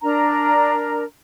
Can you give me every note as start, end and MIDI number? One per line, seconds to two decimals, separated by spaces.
0.02 1.03 62
0.02 1.03 70
0.02 1.03 82